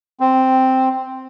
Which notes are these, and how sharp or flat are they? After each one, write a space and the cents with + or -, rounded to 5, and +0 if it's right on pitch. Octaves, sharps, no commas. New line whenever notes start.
C4 -5